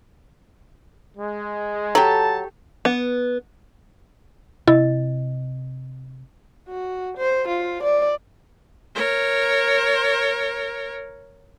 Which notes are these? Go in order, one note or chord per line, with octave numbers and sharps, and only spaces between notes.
G#3
F#3 G4 A4 A5
B3
C3 E4 D#5
F#4
C5
F4
D5
A#4 C#5